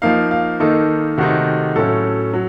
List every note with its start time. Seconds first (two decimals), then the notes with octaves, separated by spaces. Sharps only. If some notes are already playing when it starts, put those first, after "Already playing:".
0.02 F3 A#3 D#4 F5
0.31 F5
0.60 D#3 A#3 D#4 A4
1.18 C3 D#3 A3 C4 D#4 F#4
1.76 A2 F#3 A3 C#4 A4
2.34 F#3